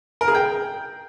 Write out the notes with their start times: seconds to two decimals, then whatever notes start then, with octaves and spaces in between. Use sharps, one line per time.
0.21 A#4
0.28 G#4
0.35 G5